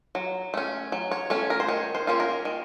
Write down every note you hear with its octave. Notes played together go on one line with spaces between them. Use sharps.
F#3
A3 C#4
F#3
C#5
A3 C#4 C#5
A#4
C5
D#3 C#5
C5
A#3 C#4 F4
A#4
D#3